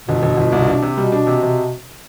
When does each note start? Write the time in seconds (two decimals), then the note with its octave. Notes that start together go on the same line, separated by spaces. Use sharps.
0.08 G1 B2
0.23 G1
0.37 G1
0.52 C2
0.68 D4
0.82 C3
0.97 B2 G3
1.12 D4
1.27 C3
1.43 C3